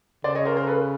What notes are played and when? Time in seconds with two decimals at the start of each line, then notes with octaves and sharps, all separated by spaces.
0.24 C#3 C5 D5
0.35 C#5 D#5
0.45 A#4 C5
0.57 A#4 C5
0.67 A4 B4